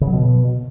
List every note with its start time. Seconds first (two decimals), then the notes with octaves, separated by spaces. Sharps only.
0.01 C#3
0.07 F#3
0.13 B2